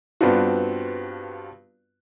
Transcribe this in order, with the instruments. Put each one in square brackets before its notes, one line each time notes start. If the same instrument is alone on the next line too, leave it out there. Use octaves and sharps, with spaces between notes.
[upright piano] G2 B3 C4 D4 F4 F#4